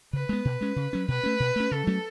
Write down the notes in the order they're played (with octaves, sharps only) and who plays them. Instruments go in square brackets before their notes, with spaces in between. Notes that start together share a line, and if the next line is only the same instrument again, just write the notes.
[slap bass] C#3 [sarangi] B4
[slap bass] G#3 B3
B2
G#3 C#4
C#3
F#3 C#4
[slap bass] B2 [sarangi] B4
[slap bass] A3 C#4
B2
A3 C#4
[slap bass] C#3 [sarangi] A4
[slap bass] F#3 A3 C#4